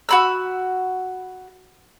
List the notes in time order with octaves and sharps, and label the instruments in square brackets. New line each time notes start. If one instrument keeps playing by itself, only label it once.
[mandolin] F#4 B5 E6